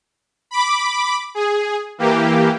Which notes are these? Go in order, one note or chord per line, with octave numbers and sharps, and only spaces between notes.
B5 D6
G#4
E3 A#3 G4